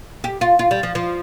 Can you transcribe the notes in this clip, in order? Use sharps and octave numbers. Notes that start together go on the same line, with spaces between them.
G4
F4
F4
G3
F3
F3